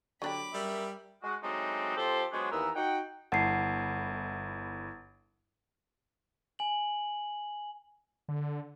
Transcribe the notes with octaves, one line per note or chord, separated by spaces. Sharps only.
D3 F#3 D4 G4 B5 D6
G3 A#4 E5
G#3 F#4
F#3 G#3 A3 C4 D4 D#4
F3 C4 G4 A4 C5
F#3 G#3 B3 D4 C5 C#5
D#2 E3 B3 A#4 A#5 E6
D#4 F#4 F#5 G5
G1 E4 F#5 A5 C7
G#5 F#7
D3